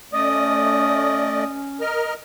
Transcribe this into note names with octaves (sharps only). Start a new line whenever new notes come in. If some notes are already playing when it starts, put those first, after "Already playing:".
A3 C#4 D5 D#5 D#6
A#4 D#5 F6